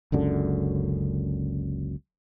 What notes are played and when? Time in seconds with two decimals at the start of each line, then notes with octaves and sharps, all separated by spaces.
0.12 F#1 C#2 F#2 D3